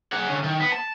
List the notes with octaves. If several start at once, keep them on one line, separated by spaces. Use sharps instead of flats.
G#4 F#5
D3 C#4
D#3
B3
A5